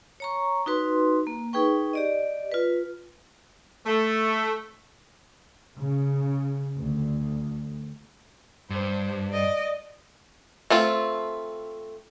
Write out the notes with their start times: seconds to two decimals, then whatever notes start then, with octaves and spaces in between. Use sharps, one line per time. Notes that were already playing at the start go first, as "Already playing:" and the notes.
0.20 C#5 A#5 C#6
0.66 D#4 F#4 B4 C6
1.27 A#3
1.53 D#4 G#4 B4 G5 C#6
1.93 G4 D5 D#5
2.51 F4 B4
3.86 A3
5.78 C#3
6.76 D2
8.70 G2 C5
9.30 D5 D#5
10.70 A3 C4 F4